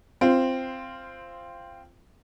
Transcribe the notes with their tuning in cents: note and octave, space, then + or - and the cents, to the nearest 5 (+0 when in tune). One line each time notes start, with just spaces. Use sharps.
C4 +0 F4 -15